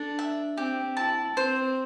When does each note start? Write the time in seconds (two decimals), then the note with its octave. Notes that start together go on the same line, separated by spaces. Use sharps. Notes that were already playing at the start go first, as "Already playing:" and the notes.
Already playing: D4 A4
0.19 E5
0.57 C4 G4
0.97 E4 A5
1.36 C4 C5